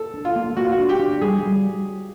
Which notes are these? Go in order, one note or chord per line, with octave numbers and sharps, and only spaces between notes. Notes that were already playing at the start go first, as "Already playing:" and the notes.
Already playing: A4
D4
F4
A#3
A#3 F#4
F4
F#4
D4
G4
D4
G3 G#4
G3